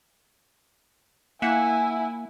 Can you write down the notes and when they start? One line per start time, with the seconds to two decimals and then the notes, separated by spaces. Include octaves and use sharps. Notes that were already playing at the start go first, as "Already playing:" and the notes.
1.42 A#3 E4 E5 F#5 G#5